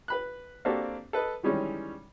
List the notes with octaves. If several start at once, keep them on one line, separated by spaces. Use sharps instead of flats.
B4 B5 F#6
A#3 C4 D4 F#4 G4 A4
A4 B4 D#5
D#3 E3 G3 G#3 C#4